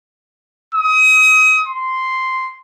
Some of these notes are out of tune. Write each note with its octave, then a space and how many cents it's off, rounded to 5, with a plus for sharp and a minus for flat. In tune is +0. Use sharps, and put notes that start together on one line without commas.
D#6 +30
C6 -5